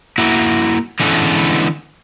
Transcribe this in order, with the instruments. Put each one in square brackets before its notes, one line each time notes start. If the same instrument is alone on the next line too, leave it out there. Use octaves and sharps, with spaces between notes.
[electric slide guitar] A#3 E4 F#4
D3 E3 G#3 B3 C#4 A4